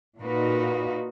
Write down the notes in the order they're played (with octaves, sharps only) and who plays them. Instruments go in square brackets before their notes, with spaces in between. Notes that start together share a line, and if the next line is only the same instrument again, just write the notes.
[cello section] A#2 A#3 D#4 F#4 B4